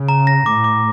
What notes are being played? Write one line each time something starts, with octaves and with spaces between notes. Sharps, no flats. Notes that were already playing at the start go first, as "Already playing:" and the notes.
Already playing: C#3
A#5
A#6
A2 D6
D6